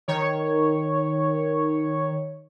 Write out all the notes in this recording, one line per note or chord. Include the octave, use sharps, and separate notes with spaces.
D#3 C#5